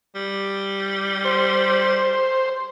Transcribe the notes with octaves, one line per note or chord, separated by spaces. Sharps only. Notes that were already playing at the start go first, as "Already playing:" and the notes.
G3
C5